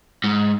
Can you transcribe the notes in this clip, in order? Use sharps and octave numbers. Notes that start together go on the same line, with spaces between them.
G#2